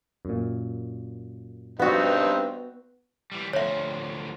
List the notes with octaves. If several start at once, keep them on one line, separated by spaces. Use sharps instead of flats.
F#2 A#2
G2 B3 C4 D#4 F#4
E3 G3
D2 F3 C#5 E5